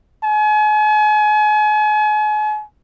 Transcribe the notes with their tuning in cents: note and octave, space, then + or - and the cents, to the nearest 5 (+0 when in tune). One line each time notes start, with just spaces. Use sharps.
G#5 +40